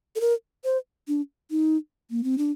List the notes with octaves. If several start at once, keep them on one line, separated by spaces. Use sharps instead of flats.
A4
A#4
C5
D4
D#4
A#3
C4
D4